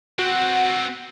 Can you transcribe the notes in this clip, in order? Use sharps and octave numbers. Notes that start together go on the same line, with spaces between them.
B3 C4 F#4